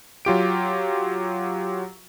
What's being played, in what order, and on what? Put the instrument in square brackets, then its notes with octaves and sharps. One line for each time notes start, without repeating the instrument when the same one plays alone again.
[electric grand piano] F#3 F4 G4 D7